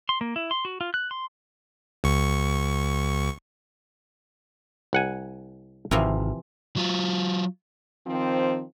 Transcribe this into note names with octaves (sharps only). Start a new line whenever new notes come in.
C6
A#3
E4
C6
F#4
F4
F#6
C6
C#2 C#6
C2 F#5 G#5
G#1 C3 E3 F3
F#3 F4
D#3 F3 C4